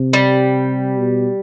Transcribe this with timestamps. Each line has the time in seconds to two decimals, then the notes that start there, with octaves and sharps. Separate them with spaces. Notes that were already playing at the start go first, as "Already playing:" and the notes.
Already playing: C3
0.13 G3
0.99 B2